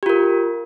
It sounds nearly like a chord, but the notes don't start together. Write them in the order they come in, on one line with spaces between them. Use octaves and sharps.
G4 F4 A#4